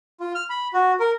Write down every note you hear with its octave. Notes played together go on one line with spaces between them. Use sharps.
F4
F6
B5
F#4
A#4